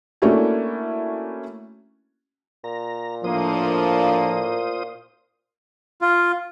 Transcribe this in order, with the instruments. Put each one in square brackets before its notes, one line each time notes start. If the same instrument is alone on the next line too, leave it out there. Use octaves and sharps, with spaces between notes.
[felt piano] A3 A#3 C#4 D4 E4 F#4
[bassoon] A#2 [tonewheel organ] A#5
[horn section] A2 A#3 [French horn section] F3 D4 [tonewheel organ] F4 C5 D#6
[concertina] F4